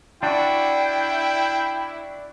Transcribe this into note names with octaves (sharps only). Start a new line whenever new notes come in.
D4 E4 F#4 G5